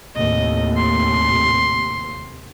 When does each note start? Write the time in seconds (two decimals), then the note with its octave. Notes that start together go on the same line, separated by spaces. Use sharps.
0.16 D#2 A2 C3 D#5
0.77 C6